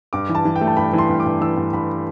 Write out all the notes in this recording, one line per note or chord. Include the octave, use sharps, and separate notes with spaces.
G2 D6
E3
A5
E3
G5
A3
A5
G2 B5
E3
C6
G2
D6
G2
E3 E6
G2
G2 B5